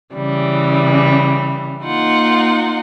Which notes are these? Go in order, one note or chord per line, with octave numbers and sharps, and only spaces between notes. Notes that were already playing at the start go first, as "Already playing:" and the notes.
C#3 E3 G3
A#3 D#4 F4 F#5